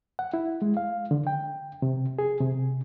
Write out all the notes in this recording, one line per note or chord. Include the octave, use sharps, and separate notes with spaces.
F#5
E4
G#3
F5
D3
G5
C3
G#4
C3